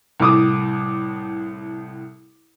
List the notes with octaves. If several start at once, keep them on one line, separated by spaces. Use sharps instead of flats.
C2 A2 D6 D#6